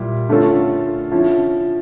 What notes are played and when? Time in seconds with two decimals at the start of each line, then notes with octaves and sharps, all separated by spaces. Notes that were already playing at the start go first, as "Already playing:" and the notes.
Already playing: A#2 G3 E4
0.29 D3 A3 C#4 F4 A4
1.11 D3 F3 C#4 E4